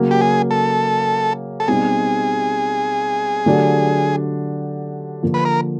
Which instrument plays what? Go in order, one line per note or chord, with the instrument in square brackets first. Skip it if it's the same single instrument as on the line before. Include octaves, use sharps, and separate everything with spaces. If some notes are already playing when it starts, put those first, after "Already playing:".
Already playing: [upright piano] C#3 F#3 A#3
[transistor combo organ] G4
G#4
A4
A4
[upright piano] B2 G3 C4 D#4 G4 [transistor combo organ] G#4
[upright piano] D3 F#3 A3 D4 G4
D3 F3 A#3
[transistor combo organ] B4
A#4